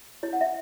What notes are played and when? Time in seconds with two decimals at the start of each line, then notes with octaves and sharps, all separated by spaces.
0.23 E4 C#5
0.33 F#5
0.41 E5